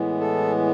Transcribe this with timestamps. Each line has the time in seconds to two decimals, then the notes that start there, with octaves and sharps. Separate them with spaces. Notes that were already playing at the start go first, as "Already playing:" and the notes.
Already playing: A2 E3 G#3 B3
0.20 A4